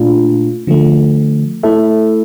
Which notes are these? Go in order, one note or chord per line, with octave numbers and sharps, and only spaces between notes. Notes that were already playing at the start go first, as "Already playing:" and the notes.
Already playing: A#2 A3 D4 F4
D3 F3 A3
A3 E4 A4 E5